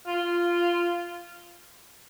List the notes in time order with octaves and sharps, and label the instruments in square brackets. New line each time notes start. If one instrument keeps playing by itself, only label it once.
[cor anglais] F4